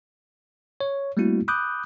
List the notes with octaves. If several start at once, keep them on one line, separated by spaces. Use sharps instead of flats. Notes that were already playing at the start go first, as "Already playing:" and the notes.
C#5
G3 A3 A#3 C4 E4 F#4
B5 D6 D#6 F#6 G6